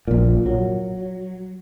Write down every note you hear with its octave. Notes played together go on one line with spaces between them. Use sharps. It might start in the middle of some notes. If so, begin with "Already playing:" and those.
A#1 A#2
F#3